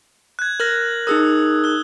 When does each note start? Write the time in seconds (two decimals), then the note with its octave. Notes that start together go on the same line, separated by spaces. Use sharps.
0.39 F#6 G#6
0.60 A#4 F6 A#6 F#7
1.07 D#4 G#4 A#4 D#6 E6
1.64 F#6 G7